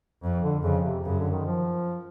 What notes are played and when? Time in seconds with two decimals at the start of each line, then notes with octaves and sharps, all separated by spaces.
0.23 F2
0.42 D3
0.63 F2 C#3
0.84 C3
1.05 F#2 C#3
1.19 D3
1.31 D#3
1.45 F3